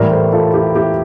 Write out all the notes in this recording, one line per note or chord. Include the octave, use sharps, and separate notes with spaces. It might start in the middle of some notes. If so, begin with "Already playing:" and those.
Already playing: A2 E3 G3 A#4 D5
A4 C5
F4 A4
E4 G4
E4 G4